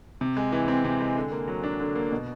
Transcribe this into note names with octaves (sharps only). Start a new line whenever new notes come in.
C3
G#3
E3
C4
C3
G#3
D3
A#3
F#3
D4
D3
A#3
B2